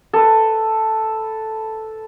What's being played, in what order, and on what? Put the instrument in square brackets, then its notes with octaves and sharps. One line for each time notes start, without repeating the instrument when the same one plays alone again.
[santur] A4 B4